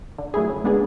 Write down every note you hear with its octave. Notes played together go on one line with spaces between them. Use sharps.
D3
F#3 A3 E4 G#4
C#3
G#3 B3 D4 G#4